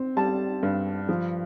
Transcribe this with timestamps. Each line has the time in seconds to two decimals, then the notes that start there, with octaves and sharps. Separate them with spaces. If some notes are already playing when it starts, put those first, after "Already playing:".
Already playing: C4
0.16 G3 A5
0.63 G2
1.09 F3